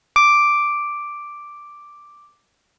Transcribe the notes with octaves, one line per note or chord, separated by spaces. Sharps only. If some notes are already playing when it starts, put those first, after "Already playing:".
D6 D7